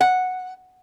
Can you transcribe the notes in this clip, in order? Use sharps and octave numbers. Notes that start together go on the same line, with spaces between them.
F#5